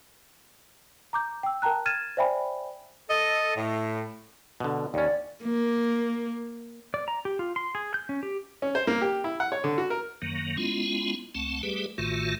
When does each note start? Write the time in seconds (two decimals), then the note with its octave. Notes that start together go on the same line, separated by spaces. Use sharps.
1.13 A#5 D6 G6
1.43 G5 E6
1.62 A#4 G5 A5 A#5 F#6
1.86 F6 G#6 A6 D#7 E7
2.17 C5 D5 E5 G5 G#5 B5
3.09 A4 D#5
3.55 A2
4.60 B2 D3
4.94 D#2 C#4 D5
5.44 A#3
6.94 D5
7.08 A#5
7.25 G4
7.39 F4
7.56 C6
7.75 G#4
7.94 G6
8.09 C#4
8.23 G4
8.62 C#4
8.75 C5
8.87 A#3
9.02 G4
9.24 E4
9.40 F#5
9.52 C#5
9.64 D3
9.78 F#4
9.90 A#4
10.22 F#2 D#3 F#3 A#3
10.57 G#3 B3 C#4 E4 F4
11.35 C#2 A3 C4 F#5 A5
11.63 G3 A3 G4 G#4 B4
11.98 A1 A2 D#3 A3 F4 F#4